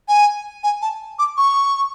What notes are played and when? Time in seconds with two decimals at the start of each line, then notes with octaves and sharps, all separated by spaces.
0.08 G#5
0.63 G#5
0.82 A5
1.19 D6
1.37 C#6